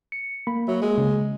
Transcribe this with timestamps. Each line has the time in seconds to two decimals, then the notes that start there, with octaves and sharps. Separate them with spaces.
0.12 C#7
0.47 A#3 B5
0.68 F#3 E5
0.82 G#3
0.98 C#3